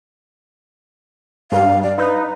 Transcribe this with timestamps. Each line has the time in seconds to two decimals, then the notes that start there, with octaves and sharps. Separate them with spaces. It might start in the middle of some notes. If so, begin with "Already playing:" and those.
1.52 G2 F5
1.83 D5
1.98 D#4 B4